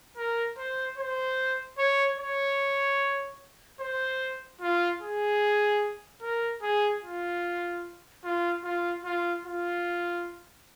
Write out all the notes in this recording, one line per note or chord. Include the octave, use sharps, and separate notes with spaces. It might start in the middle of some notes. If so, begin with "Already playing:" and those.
A#4
C5
C5
C#5
C#5
C5
F4
G#4
A#4
G#4
F4
F4
F4
F4
F4